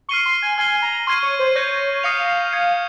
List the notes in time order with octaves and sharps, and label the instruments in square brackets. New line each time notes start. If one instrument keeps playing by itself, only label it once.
[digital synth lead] C#6 [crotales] F6 C7 D#7 G7
[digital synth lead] C6
G#5
[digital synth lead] G#5 [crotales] F6 C7 G7
[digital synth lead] A#5
[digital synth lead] C6 [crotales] C#6 F6 G#6 D#7
[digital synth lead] C#5
C5
[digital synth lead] C#5 [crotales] C#6 G6 A#6
[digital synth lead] F5 [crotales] D#6 A#6 C#7 F7
[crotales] D#6 G#6 C#7